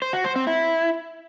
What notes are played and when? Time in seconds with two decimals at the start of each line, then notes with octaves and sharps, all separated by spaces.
0.02 C5
0.13 F#4
0.24 C5
0.36 C4
0.47 E4